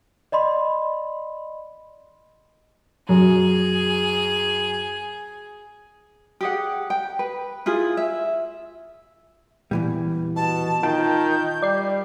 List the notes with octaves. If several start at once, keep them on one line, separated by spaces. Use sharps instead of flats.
D5 D#5 B5 C6
F#2 G#4
G4 G#4 F#5
G5
B4
E4 F4 G#4
E5
E2 A#2 E3 G3
B2 A5
D#3 F4 G5 A5 G6
G3 D5 C7